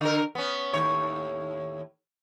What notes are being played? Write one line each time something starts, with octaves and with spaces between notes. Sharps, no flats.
D3 A#4
B3 C#4
D#2 A2 C#5